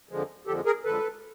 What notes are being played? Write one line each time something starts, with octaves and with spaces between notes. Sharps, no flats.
F2 D3 F3 G#3
F2 D3 F3 G#3 G4 A4
G#4 A#4
F2 D3 F3 G#3 A4 B4